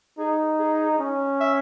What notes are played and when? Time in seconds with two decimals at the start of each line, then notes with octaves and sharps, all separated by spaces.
0.18 D#4 G#4
0.59 G#4
0.99 C#4
1.40 E5